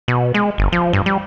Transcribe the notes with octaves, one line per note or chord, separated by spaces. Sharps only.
B2
G#3
G1
F3
G2
G3